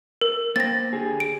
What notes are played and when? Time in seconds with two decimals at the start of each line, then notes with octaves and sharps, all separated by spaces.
0.21 A#4
0.56 A#3 C5 G5 A6 A#6
0.93 D3 G4 G#4
1.20 D7